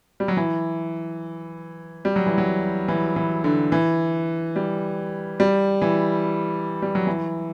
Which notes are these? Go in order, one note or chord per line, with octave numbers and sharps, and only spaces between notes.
G3
F#3
E3
G3
F#3
E3
F#3
E3
E3
D3
E3
G3
G3
E3
G3
F#3
E3